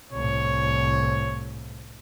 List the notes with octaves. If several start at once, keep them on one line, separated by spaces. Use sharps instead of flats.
C2 A2 C#5